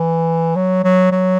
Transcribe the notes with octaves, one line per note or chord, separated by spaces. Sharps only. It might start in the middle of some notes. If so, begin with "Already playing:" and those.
Already playing: E3
F#3
F#3
F#3